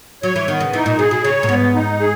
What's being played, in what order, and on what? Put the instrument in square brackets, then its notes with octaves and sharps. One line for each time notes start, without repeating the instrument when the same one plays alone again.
[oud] F#3 [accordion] C#5
[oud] E3
[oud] D#3 [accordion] B3
[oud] C#3
[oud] E3 [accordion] D#4
[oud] A#2
[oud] B2 [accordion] G#4
[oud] B2
[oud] C#3 [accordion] C#5
[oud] A#2
[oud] G#2 [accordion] B3
[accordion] D#4
G#4